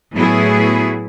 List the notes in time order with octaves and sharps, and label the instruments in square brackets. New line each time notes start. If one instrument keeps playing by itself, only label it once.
[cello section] A2 F#3 B3 E4 F#4 G#4